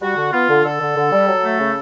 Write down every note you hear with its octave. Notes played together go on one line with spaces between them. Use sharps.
G3 F#4
D3
B3 F4
D3
D3 A4
D3
D3
G3
F#3
A3
C#3